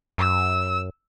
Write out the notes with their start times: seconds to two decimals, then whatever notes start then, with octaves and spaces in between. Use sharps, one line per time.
0.18 F#2 E6